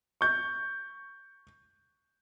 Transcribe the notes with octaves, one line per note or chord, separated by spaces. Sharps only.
C#6 G6